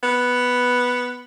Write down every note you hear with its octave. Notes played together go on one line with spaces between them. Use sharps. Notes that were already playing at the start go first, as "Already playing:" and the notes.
B3